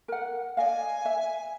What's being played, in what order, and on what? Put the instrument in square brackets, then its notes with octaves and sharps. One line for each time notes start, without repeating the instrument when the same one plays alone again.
[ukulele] A#4 F#5
[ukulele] D5 D#5 F5 [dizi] G#5
[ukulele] E5